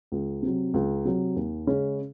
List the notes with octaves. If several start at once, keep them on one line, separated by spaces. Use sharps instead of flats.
C#2
C3 F#3
C#2
C3 F#3
D#2
C#3 G#3 C#4